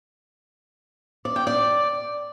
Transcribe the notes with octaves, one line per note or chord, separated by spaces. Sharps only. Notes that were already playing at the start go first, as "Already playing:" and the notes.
D5
G5
D5